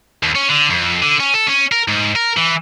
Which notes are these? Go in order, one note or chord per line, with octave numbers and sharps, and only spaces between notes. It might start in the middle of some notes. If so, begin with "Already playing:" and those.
D#2
C#4
D3
F2
D3
C#4
A4
C#4
A#4
G#2
A#4
E3